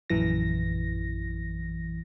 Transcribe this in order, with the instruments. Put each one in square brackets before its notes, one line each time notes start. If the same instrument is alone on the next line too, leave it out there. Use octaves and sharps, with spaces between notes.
[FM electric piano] A#1 F#2 E3 A#6